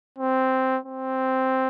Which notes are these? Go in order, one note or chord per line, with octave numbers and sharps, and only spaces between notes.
C4
C4